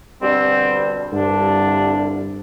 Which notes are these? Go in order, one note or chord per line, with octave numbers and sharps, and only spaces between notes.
B2 D3 G3 C4
C2 G2 D3 D4